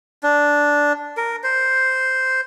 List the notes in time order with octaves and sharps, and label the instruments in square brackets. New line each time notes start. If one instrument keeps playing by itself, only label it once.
[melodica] D4
A#4
C5